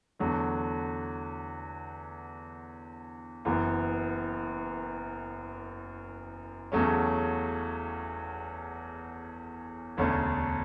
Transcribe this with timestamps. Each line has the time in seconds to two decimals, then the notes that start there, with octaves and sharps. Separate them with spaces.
0.19 E2 D3 F#3 A3
3.45 F#1 F#2 E3 B3
6.72 E2 C#3 F#3 A3 C#4
9.97 E1 D2 D3 A3 C#4